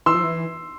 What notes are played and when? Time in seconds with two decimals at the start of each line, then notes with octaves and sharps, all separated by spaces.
0.06 E3 C6 E6
0.14 F3
0.23 E3